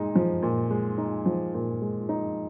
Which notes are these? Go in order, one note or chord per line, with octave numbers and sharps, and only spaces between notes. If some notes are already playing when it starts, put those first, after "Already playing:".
Already playing: A#2 G#3 D#4
F3
A#2
G#3
D#4
F3
A#2
G#3
D#4